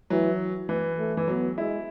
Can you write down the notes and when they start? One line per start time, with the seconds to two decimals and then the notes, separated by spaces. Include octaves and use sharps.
0.10 E3 F#3
0.69 E3
0.98 A3
1.17 E3
1.28 F#3 B3
1.57 G#3 E4